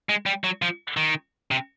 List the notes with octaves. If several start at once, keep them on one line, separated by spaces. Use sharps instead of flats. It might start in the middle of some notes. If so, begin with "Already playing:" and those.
G#3
G3
F#3
F3
D#3
C3